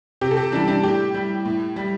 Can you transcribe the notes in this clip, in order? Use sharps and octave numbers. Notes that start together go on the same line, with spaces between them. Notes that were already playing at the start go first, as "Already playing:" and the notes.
C3 G4
A4
G4
E3 G3 D4
D4
A2 G4
G3
A2
G3